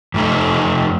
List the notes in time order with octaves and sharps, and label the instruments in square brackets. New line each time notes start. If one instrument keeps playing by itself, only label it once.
[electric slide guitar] F2 A3 D#4